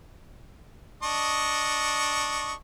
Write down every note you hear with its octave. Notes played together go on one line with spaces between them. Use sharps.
D4 D#5 C#6